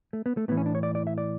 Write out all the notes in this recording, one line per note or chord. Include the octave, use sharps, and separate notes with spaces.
A3
B3
A3
A2 E3 B3
C#4
D4
C#5
D5
D5
E5
D5